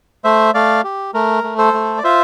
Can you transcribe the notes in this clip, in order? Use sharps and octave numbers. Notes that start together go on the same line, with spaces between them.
A3 C5 E5
A3 D5 F5
G4
A3 A#4
A3
A4 C5
A3
D5
F4 C5 E5